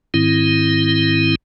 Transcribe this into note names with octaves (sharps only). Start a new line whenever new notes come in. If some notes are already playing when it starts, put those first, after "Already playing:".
G#2 D#3 C4 E4